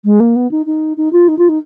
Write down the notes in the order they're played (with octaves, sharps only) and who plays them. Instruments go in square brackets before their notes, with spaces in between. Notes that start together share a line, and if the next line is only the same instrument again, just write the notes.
[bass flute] G#3
A#3
B3
D#4
D#4
D#4
F4
D#4
F4
D#4